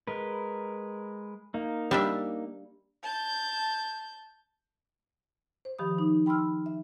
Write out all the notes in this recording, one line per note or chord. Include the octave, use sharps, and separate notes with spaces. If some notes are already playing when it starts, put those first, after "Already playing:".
G#3 A#4 B4
A#3 D#4
G3 D4 E5
A5 G6
C5
D#3 F3 G4 B5 D#6
D#4
G5 B5 C6 E6 F6
E5